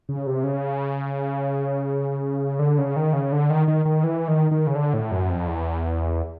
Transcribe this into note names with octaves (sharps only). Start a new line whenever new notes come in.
C#3
C3
C#3
D3
C#3
D#3
C#3
D3
D#3
D#3
D#3
E3
D#3
D#3
C#3
D3
A2
F#2
F2
E2